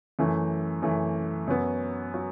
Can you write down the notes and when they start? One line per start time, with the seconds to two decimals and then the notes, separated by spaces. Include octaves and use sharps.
0.19 F#2 E3 A3
0.82 F#2 E3 A3
1.48 F#2 F#3 B3
2.14 F#3